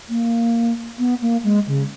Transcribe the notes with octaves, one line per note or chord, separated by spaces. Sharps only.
A#3
B3
A#3
G#3
C#3